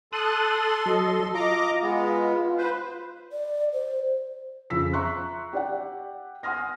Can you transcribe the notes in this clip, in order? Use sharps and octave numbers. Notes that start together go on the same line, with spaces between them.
A4 A5 C6 D#6 F#6
F#3 D#5
F4 D#5 A#5 D6
G#3 B3
B4 C5
D5
C5
F2 C#3 F4 E6 B6
E5 A#5 C6 C#6 F#6
G4 D5 F#5
F#5 G#5 C6 D#6 F6 A#6